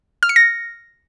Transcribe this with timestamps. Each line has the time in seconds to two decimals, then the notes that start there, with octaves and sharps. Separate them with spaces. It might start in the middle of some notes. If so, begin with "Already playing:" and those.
0.23 F6
0.29 C#7
0.36 A#6